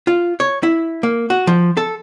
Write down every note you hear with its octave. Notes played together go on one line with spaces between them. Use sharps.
F4
C#5
E4
A#3
F#4
F3
A4